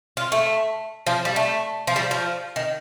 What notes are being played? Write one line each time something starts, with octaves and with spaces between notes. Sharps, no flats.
F4
A3
F3
G3
A3
F3
G3
F3
D#3